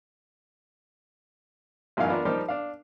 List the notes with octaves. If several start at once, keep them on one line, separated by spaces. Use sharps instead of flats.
A1 F#2 E3 D#4 F5 G#5
B3 D4 F4 A#4
F3 G3 D#4 G4 A#4 C5
D4 F5